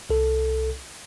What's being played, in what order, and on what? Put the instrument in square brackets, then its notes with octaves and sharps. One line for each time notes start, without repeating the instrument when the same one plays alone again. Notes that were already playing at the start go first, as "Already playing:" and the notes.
[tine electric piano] C2 A4